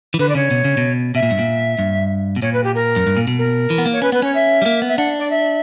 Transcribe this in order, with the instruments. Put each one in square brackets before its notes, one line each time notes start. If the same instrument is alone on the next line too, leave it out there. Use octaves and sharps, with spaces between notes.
[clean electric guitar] E3
[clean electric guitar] D3 [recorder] B4
[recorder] D5
[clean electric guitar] C#3 [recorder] C#5
[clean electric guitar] B2
C#3
B2
[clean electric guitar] B2 [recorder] E5
[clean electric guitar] A#2
G2
A#2
G2
B2
[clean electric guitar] A#2 [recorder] C#5
[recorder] B4
G4
A#4
[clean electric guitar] F#2
G2
A#2
B2
[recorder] A#4
[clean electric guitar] E3
B3
A#3
[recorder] C#5
[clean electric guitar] C#4 [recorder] B4
[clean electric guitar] B3 [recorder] B4
[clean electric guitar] C#4 [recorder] C#5
[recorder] E5
[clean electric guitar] G3
A#3
B3
[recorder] E5
[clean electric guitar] D4 [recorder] F#5
[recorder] D5
E5